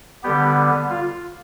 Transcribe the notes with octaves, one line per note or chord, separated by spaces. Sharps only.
D3 G3 B3 G4
F4